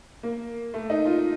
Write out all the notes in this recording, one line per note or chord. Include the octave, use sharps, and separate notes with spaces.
A#3
A3
D#4
F4